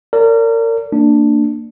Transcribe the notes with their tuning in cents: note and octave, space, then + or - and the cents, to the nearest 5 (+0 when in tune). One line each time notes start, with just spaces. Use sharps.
A#4 -30 D5 -40
A#3 -30 D4 +5